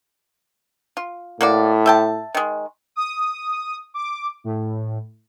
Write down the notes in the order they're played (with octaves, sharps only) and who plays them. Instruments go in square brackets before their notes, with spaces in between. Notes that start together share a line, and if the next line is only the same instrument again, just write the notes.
[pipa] F4
[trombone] A2 [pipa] A#3 F#4 D5
[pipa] E5 G5 A5
D#3 G#3
[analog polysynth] D#6
D6
A2